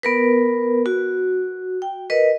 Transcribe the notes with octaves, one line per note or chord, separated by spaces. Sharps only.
B3 A#4 B4
F#4
G5
A#4 B4 D#5